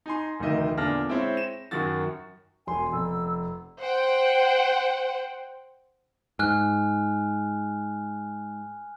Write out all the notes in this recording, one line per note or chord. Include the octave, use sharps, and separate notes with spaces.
D#4 G#5 C6
F1 D2 D#3 D#4 D#5 E5
E2 A#2 D3 D4 F6 A#6
G#3 C4 E4 C5 C#5
E7
F#2 D#3 F#3 F#4 A6
E1 G#5 C6
F1 E6
C5 F#5 G5
G#2 G#5 F6 F#6